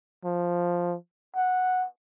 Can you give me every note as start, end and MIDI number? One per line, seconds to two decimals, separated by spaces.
0.25 0.96 53
1.35 1.86 78